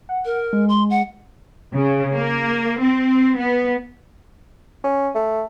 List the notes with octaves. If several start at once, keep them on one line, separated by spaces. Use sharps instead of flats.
F#5
A#4
G#3
C6
F#5
C#3
A#3
C4
B3
C#4
A3